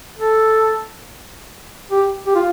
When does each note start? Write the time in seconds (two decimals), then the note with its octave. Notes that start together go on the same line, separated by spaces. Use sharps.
0.19 A4
1.91 G4
2.26 G4
2.35 F4